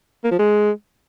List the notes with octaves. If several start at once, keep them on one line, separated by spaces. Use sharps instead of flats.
A#3
F3
G#3